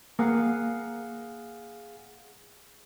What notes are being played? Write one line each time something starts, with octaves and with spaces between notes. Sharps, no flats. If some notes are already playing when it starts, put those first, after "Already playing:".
A#3 G#4 F5 F#5